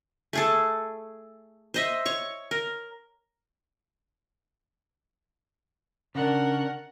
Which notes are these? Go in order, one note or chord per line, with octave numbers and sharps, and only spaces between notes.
A3 G#4 A4
C5 D#5 E5
C#5 C#6
A#4
C#3 D4 A#4 F#5